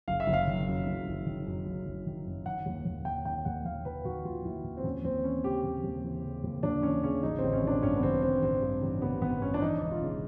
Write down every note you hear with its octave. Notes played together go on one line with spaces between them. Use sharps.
F#1 F5
E5
F#1
F5
D#3
F#2
F#1
F#1
D#3
F#2
F#1
F#1
D#3
F#2
D#3 F#5
D#2
D#2
D#3 G5
D#3 G5
D#2 F#5
D#2 F5
D#3 B4
D#3 F#4
D#2 F4
D#2 E4
D#3
C4
D#2 C#4
D#2 C4
E3 C#4
C#3 G4
D#2
D#2
E3
C#3
D#2
D#2 D4
E3 C#4
C#3 C#4
A1 D#4
A1 C4
C#4
D#3 D4
G2 C#4
B3
A1 C4
A1 C4
D#3 C4
G2
A1
A1 B3
D#3 B3
G2 C#4
D4
E3 D#4
E1
F4
C#3